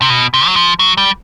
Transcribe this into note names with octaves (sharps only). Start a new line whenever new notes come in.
C3
B2
C3
F#3
F3
F#3
G3